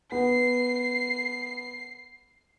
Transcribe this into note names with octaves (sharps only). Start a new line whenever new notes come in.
B3 C7